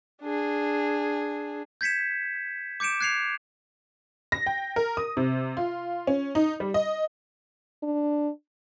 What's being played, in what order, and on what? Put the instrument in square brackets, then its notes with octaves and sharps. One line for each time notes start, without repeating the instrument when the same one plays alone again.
[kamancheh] D4 G#4
[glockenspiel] G6 G#6 B6 C#7 E7
D6 G6 C#7 D7 E7
F#6 G#6 C7 C#7 F7
[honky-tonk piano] A#6
G5
A#4
D#6
C3
F4
C#4
D#4
G3
D#5
[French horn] D4